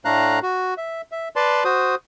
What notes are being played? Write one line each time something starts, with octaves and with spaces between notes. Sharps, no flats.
A2 A3 D4 F5 A#5 F#6
F#4
E5
E5
B4 D5 A5 C6
F#4 C5 D#6